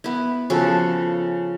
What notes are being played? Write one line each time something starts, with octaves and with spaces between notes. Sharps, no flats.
B3 E4
C#3 F3 F#4 A4